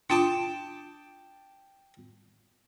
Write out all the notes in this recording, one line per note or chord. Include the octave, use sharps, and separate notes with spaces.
D4 F4 G5 A5 D6